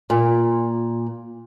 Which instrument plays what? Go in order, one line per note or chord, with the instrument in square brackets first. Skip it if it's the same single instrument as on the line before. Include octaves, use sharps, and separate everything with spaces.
[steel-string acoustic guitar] A#2